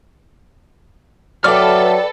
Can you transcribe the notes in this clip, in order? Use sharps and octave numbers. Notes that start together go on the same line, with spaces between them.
F#3 A4 B4 D5 E5 G5 D6 F6